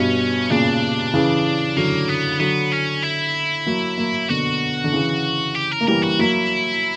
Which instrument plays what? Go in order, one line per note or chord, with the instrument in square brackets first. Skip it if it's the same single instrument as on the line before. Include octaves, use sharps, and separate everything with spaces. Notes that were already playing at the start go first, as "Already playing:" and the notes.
Already playing: [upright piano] G2 B2 [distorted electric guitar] C#4
[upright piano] A#2 C#3 [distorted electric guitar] D4
[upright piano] C#3 E3
[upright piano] D3 F#3 [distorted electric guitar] A#3
[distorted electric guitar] B3
[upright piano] D3 F#3 [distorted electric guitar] B3
[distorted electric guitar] C#4
E4
[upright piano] F#3 A#3
F#3 A#3
[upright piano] B2 D3 [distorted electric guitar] F#4
[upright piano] D3
C#3 E3
[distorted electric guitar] G4
A#4
[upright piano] A#3
[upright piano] E3 G3 [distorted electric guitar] A#4
[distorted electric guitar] F#4
[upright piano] F#3 A#3 [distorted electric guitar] E4